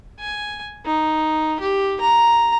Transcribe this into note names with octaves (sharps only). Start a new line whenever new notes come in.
G#5
D#4
G4
A#5